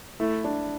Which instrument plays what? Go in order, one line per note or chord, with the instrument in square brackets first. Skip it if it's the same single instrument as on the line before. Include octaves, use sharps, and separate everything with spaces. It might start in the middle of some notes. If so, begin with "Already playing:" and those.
[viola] A3 [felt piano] E4
[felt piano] D4